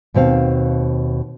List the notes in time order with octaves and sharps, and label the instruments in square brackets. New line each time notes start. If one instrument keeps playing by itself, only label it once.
[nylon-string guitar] D#2 B2 C4 F5